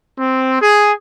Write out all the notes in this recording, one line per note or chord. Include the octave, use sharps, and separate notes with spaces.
C4
G#4